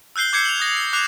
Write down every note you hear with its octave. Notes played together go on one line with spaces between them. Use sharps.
E6 F#6 G6 C7 G7
D6 G6 G#6 C7 C#7
F7 F#7
D#6 A#6 F7
C#7
D6 F#6 C7 F7